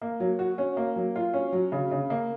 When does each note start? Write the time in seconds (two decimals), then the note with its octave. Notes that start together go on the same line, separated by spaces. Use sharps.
0.02 A#3
0.20 F#3
0.39 F#4
0.58 C#4
0.77 A#3
0.96 F#3
1.16 F4
1.34 C#4
1.53 F#3
1.72 C#3
1.91 C#3
2.10 A#3